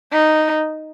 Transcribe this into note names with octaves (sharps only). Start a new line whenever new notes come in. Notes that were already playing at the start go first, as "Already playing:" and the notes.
D#4